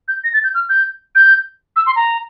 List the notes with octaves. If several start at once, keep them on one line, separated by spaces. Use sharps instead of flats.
G6
A#6
A6
G6
F6
G6
G6
E6
C6
A#5